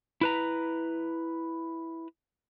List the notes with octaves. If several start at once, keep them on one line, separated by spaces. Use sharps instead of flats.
E4 B4 A#5